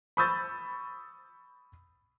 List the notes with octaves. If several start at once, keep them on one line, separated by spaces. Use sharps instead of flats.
B5 C#6 D#6 E6 G6 A6